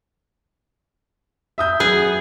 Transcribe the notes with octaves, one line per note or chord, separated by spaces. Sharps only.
E5 D#6 G6
F#2 B3 G#4